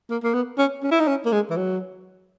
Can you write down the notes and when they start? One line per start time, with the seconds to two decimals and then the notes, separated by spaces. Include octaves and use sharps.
0.10 A#3
0.23 A#3
0.34 B3
0.58 C#4
0.83 C#4
0.91 E4
1.00 D#4
1.07 C#4
1.26 A#3
1.32 G#3
1.50 E3
1.56 F#3